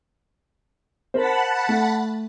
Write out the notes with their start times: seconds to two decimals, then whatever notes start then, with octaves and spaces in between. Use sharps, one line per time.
1.14 A#4 C5 F#5 A5 B5
1.69 A3